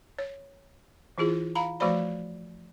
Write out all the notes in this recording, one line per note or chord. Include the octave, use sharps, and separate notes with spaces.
C#5
E3 E4 F4 G#4
F5 A#5 B5
F3 A3 F#4 C5 D5 B5